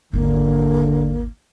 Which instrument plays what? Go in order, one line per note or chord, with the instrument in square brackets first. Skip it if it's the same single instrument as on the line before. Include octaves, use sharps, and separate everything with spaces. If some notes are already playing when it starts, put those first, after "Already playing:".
[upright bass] G#1 D#2 [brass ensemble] D3 [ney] A#3